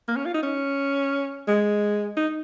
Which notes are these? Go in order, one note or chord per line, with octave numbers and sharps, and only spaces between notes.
A#3
C#4
F4
D#4
C#4
G#3
D#4